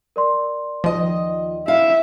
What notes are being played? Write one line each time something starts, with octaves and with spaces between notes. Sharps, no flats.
A#4 D5 C6
D#2 F3 D#5
E4 E5 F5